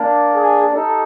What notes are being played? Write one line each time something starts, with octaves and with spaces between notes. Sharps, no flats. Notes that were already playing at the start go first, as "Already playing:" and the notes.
Already playing: A#3 D4
G#4
D#4 G4 A4